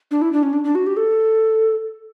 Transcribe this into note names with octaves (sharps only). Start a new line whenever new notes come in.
D4
E4
D4
C#4
D4
D4
F#4
G4
A4